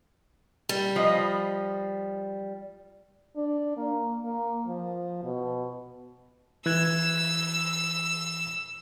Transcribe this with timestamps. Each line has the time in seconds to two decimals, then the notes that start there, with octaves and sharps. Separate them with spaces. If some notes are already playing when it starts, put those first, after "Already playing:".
0.69 G3
0.96 F3 B4 D#5
3.36 D4
3.77 A#3
4.24 A#3
4.67 F3
5.23 B2
6.66 E3 E6 F#6 G#6